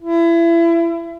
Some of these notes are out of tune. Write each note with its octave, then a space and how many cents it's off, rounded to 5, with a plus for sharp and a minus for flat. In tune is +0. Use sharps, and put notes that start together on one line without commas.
E4 +30